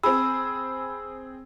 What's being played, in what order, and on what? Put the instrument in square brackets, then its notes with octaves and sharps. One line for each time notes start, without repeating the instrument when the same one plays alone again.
[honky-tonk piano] C4 G#4 [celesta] B5 [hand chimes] E6